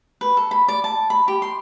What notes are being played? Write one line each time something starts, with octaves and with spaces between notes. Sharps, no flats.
B4
A4
B5
D5
A5
B5
G4
C6